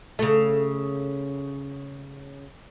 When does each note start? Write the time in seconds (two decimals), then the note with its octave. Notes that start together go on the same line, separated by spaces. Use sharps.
0.19 C#3 A3